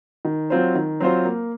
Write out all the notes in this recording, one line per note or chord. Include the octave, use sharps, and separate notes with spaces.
D#3
F#3 C4 F4 C5
D#3
F#3 C4 F4 C5
A#3